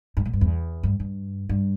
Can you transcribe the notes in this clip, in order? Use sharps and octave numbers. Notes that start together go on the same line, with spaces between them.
G2
A2
G2
E2
G2
G2
G2